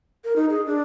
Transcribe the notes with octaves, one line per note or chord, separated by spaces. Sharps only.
A#4
D#4
G#4
D4